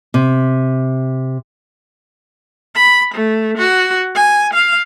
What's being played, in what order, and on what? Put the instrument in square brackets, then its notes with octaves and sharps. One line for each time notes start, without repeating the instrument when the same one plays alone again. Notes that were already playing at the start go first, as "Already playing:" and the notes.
[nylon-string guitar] C3
[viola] B5
A3
F#4
G#5
F5